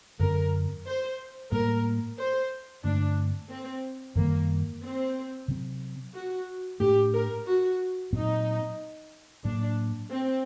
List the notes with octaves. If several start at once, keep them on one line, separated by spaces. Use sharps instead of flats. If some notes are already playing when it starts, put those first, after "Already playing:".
F#2 D3 F#3 C4 A#4
C5
A2 G3 A#3 A#4
C5
G2 D3 A3 C4 D4
C4
F#2 D#3 G3 A#3
C4
C3 F#3 C4
F#4
A2 A3 D4 G4
A#4
F#4
A#2 F#3 C4 D#4
A2 F#3 A#3 D4
C4